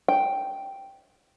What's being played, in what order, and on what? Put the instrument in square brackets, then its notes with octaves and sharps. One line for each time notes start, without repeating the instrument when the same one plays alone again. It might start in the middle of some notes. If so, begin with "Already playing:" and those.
[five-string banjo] G5